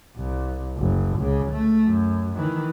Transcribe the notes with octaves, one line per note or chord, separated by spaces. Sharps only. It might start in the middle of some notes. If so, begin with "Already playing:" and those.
C2
F#1
C#2 C#3
A3
F#2
D#3 E3